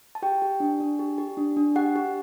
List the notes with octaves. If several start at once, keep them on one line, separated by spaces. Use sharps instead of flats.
A5
G4 G5
G4
D4
D4
G4
G4
D4
D4
G4 F#5
G4